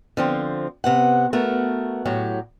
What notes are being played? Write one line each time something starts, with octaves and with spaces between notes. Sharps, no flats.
D3 F3 C4
C3 B3 F#5
A3 B3 F#4 A#4
A2 F#3 G4